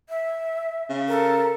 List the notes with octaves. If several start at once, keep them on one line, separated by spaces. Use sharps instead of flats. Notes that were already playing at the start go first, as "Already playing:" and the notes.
E5
C#3
A4 A#4